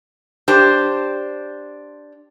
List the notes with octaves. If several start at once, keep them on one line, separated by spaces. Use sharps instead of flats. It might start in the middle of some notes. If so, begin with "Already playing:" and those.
D4 G4 C5